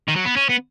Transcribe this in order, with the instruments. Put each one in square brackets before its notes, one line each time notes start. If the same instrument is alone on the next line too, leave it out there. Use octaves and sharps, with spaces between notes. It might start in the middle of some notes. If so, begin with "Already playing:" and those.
[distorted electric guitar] D#3
F#3
B3
C#4
B3